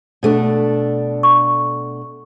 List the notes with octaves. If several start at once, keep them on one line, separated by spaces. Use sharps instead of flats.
B2 A3 D4
C#6